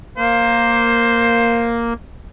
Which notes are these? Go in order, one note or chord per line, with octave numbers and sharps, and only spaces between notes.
A#3 C5